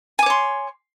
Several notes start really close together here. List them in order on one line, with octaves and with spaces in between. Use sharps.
G#5 D6 C#5 C6